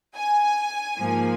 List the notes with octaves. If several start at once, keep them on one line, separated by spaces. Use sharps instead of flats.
G#5
G#2 F3 A#3